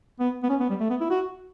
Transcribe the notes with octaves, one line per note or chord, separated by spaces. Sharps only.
B3
B3
C#4
B3
G3
A3
B3
E4
F#4